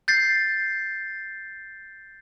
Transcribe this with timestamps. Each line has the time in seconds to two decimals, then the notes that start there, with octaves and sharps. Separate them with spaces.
0.08 G6 A6 C7